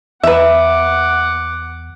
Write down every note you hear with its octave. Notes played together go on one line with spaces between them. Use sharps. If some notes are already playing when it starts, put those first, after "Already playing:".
E2 B4 E5 F#5 D6